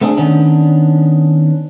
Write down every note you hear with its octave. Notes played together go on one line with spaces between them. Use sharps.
A3 B3 C4 D4 G#4
D#3 B3 C#4 D4